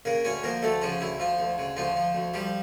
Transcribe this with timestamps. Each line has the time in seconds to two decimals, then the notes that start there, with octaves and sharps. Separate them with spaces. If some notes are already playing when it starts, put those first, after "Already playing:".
0.05 C#3 A#3 A#4
0.25 D2 C#4 C#5
0.44 F3 A#3 A#4
0.62 D2 A3 A4
0.82 C#3 F3 F4
1.01 D2 E4
1.20 F3 F4
1.39 D2
1.58 C#3
1.77 D2 F3 F4
1.96 F3
2.15 D2
2.34 F3 G3 G4